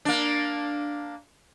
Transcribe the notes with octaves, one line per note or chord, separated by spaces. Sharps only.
A#3 D4